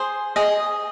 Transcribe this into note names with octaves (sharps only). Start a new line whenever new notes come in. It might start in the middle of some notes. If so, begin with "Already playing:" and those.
Already playing: G#4 C5
G#4 D#5